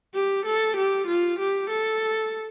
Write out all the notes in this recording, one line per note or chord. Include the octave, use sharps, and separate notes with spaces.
G4
A4
G4
F4
G4
A4